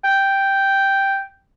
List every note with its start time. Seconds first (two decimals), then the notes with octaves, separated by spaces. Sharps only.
0.04 G5